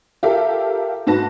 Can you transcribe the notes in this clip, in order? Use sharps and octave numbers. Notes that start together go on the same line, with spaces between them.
F4 G4 A4 A#4 E5 F5
G#2 F#4 B4 A5 A#6